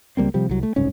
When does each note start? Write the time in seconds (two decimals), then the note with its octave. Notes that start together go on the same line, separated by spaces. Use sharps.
0.17 C#2 G3 A#3 C4
0.34 C3 F3 G3
0.49 C2 F#3
0.63 A3
0.76 F#1 C2 G#2 C#4